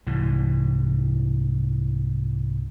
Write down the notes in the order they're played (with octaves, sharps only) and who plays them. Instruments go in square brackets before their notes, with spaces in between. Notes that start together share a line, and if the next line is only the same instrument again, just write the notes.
[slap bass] C2 G#2 E3